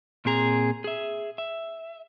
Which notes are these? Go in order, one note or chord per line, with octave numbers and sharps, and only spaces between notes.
A#2 C4 G#4 A#5
G#4 E5
E5